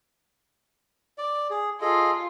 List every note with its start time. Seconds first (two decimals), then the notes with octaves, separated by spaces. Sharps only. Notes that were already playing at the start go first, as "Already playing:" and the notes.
1.18 D5
1.50 G#4
1.81 F4 G#4 A4 D#5